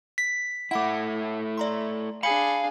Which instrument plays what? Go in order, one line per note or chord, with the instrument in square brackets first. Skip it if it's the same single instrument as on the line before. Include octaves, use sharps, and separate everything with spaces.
[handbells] B6
[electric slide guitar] A3 E4 [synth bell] F#5 B5 D6
[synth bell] D5 A#5 C6
[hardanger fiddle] D4 G#4 [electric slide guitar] F5 [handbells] B5 C#7